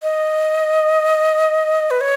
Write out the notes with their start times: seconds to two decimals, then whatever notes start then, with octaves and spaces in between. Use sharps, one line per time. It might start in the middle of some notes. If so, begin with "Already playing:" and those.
0.03 D#5
1.91 B4
2.01 C#5